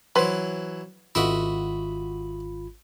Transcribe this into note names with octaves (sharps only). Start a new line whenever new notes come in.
E3 F#3 B4 C5
G#1 F4 F#4 D#5 E5 B5